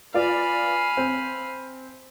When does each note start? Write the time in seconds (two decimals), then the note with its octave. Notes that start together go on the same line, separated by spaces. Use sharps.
0.14 F4 B4 D5 F5 G#5 B5
0.97 C4